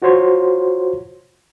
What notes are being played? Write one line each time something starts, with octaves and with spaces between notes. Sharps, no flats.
F4 F#4 C5 C#5 C6